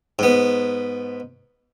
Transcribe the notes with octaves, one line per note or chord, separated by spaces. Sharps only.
G#2 B3